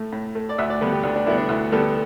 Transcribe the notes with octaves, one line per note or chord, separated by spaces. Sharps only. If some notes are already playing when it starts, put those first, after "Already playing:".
Already playing: A2 A3
A2
A3
D5
D2 E5
D5
D3 G3 B3 B4
G4
D2 D4
D4
D3 G3 B3 E4
D4
D2 E4
D3 G3 B3 A4